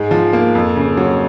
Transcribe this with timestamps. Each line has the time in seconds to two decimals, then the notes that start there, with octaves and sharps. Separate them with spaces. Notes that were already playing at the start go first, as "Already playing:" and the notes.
Already playing: G#2 G#3
0.11 F3
0.33 A#3
0.55 F2
0.76 C#3
0.97 F#3